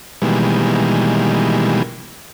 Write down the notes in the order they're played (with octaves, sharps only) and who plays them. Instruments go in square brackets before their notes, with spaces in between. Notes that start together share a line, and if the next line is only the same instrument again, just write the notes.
[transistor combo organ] B2 D#3 E3 G3 G#3 A#3